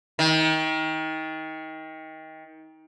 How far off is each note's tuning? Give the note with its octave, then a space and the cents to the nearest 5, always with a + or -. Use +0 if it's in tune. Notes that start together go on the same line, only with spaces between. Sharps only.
D#3 +25